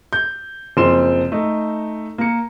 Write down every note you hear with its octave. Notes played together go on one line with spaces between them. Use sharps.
G6
F#1 F3 C4 C6 E7
A3 D#4
A#3 C#7